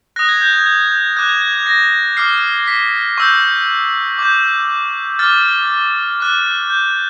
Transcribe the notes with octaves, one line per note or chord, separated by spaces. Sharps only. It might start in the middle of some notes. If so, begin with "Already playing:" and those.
D#6 F#6 A#6
G#6
G6
G#6
G#6
G6
D6 F#6 G#6
G#6
G#6
G#6
A#6
D6 F6 C7
B6
C#6 E6 G6
D6 G6
D6 F6 A6
D6 F#6
G6